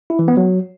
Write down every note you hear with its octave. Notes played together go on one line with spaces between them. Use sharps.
E4
E3
B3
F#3